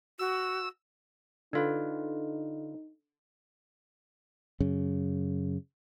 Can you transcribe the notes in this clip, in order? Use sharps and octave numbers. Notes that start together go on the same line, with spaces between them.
F#4 E6
D3 D4 D#4 F4 A4 B4
F#2 C#3